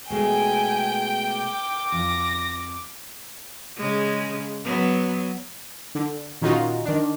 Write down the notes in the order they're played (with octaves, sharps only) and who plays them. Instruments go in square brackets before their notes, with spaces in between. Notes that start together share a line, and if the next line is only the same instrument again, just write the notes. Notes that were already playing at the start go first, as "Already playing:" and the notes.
[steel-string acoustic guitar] B2 G#3 A3 [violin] G5 [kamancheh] G#5
[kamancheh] D6
[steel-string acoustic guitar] F2 [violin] A#6
[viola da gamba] C#3 G#3
F#3 B3
[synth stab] D3
A#2 D#3 C#4 D#4 F4 F#4
D#3 D4